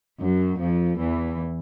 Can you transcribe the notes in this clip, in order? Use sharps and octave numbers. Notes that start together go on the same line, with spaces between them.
F#2 F#3
F2 F3
E2 E3